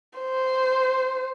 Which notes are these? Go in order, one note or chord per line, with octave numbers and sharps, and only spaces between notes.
C5